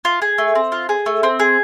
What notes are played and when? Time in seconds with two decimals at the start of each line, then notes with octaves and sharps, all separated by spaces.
0.05 F4
0.22 G#4
0.38 A3
0.55 C4
0.72 F4
0.89 G#4
1.06 A3
1.23 C4
1.40 G#4